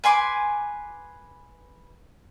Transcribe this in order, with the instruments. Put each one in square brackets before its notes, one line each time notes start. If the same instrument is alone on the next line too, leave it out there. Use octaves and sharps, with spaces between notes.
[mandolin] B4 G#5 C6 D6